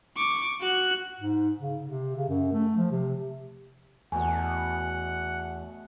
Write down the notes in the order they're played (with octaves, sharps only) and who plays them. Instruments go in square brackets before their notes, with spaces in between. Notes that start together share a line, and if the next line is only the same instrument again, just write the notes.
[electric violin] C#6 D6
F#4 F#6
[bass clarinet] G#2
C#3
C3
C#3
F#2
A3
F3
C3
[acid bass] E2 [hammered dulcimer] B2 A3 [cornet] F#5 [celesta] G#5